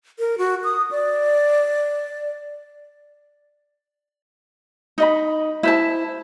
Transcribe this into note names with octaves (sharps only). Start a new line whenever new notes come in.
A#4
F#4
D#6
D5
D#4 D#5 B5
E4 C5 A5